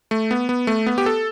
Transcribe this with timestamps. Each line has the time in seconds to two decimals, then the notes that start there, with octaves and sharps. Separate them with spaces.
0.11 A3
0.31 B3
0.49 B3
0.67 A3
0.86 B3
0.98 G4
1.06 A4